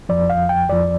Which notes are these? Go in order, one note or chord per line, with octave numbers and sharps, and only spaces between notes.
F2 F3 D5
F5
G5
F2 F3 D5